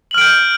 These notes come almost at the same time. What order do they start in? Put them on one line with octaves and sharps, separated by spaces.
F#7 F6 D7 G6